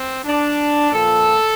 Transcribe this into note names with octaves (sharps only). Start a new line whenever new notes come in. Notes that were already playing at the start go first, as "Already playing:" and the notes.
Already playing: C4
D4
A#2 F3 A4